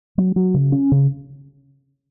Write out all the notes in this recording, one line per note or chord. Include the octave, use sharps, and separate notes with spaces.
F#3
F#3
C#3
C#4
C#3